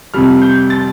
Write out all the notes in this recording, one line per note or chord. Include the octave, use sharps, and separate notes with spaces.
F2 C3 G3 F6
G6
A6